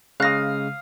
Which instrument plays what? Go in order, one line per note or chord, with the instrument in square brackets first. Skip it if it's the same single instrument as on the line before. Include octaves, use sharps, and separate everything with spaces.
[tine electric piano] C#3 G#3 [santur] F5 D#6 [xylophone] F#6 A#6